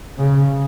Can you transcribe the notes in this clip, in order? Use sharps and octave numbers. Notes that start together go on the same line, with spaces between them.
C#3